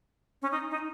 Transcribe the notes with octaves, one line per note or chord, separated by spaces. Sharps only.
C#4
D#4
D#4